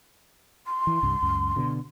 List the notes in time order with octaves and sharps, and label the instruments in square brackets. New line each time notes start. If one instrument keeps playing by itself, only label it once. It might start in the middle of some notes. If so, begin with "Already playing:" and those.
[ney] C6
[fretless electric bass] E3
C2 G2
C#2 F#2
B2 D3